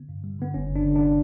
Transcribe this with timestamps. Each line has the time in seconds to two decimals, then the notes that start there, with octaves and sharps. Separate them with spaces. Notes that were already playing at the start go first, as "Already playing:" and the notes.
Already playing: D3 B3
0.09 G2
0.24 G3
0.39 D3 B3
0.54 G1 C#4
0.70 G1
0.76 D4
0.86 D3
0.95 D4